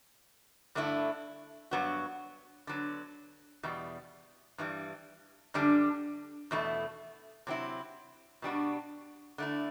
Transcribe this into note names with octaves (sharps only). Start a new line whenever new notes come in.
G2 D3 A3 E4
G2 F#3 B3 F#4
D3 F#3 B3
E2 B2 G3
G2 E3 G3
F#2 D3 G3 D4
E2 B2 A3 E4
C3 F#3 C4 E4
B2 G3 D4 F#4
D3 A3 E4